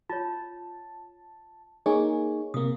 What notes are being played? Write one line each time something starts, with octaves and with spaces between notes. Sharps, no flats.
F4 C#5 A5
A#3 D#4 G#4 C#5 G#5
C3 A#3 D#6